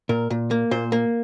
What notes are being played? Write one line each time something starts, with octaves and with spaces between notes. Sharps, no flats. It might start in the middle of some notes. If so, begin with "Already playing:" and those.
A#2 A#4
A#2
A#3
A#2 C5
A#3